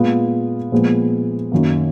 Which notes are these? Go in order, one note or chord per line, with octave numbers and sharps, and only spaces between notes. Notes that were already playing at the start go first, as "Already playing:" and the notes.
Already playing: A#2 G#3 B3 F4
A#2 F3 G#3 B3
F#2 D#3 A#3